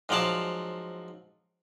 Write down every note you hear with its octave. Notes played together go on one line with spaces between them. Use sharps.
G#2 F3 F#3 D5 F5 A5